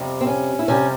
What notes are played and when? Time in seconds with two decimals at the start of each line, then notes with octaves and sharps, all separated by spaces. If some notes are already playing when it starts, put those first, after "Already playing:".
Already playing: F2 C3 G3
0.21 C4
0.27 C#4
0.59 E4
0.68 F2 C3 G3 C#4